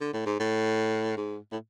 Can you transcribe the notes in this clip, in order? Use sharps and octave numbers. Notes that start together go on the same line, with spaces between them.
D3
A2
G#2
A2
G#2
A2